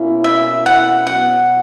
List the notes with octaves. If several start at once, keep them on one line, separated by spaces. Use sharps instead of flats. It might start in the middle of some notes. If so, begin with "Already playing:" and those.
Already playing: B2 A#3 C#4 E4
E5
F#5
B2 F#3 B3 F#5